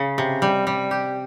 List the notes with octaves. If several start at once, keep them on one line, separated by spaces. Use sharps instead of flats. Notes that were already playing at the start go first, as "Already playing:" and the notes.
Already playing: C#3
C3
G3
G3
G4